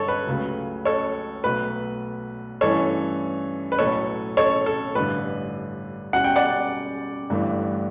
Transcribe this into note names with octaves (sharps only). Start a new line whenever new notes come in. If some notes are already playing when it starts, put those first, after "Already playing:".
Already playing: G1 G2 D3 A4 C#5
B4
C#2 C#3 F#3 A3
A4 C#5
B1 B2 A3 B4
G2 E3 A3 C#4 A4 C#5
B4
B1 A2 F#3 A3 A4 C#5
A4 C#5
A4
A1 G2 D3 B4
B2 G3 C#4 F#4 F#5
G5
D5 F#5
G1 G2 E3 A3